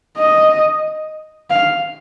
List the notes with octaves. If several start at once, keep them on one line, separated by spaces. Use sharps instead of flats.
D#5
F5